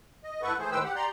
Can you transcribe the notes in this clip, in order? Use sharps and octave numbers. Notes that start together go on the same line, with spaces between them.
D#5
G2 E4 A4 B4 F#5 C#6
E3 A3 G#4 C5
A2 D#3 B4 C5 G5 E6
G4 F#5
G4 D5 A#5 C6